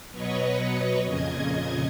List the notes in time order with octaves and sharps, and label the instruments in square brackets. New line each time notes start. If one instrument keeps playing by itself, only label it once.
[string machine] B2 F#3 B4 C#5 D#5 C#6
F2 A#2 C#3 D#5 G#6